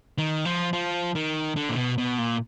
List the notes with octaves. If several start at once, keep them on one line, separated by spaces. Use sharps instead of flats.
D#3
F3
F3
D#3
D3
A#2
B2
B2
A#2